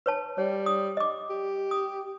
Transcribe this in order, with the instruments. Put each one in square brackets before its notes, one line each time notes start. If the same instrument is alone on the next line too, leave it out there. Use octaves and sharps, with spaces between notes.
[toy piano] B4 C#5 A5
[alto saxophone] G3 [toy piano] C#5
[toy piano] D#6
D#5 D6
[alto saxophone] G4
[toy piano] D#6